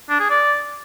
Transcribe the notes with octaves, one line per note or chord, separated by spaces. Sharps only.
D4
G#4
D5